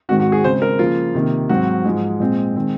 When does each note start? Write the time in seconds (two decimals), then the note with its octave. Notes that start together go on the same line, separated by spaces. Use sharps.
0.09 G#2 D#3 G#3 C4 F#4
0.20 F#4
0.32 G#4
0.44 C#3 G#3 C4 C5
0.62 A#4
0.79 C#3 F3 A#3 F4
1.15 C3 D#3 A#3
1.49 G#2 F#3 C4 F#4
1.85 G#2 F3 G#3
2.20 A#2 G#3 C4
2.55 D#3 G#3 C4